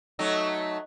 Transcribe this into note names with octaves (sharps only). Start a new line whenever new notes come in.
F#3 A3 D#4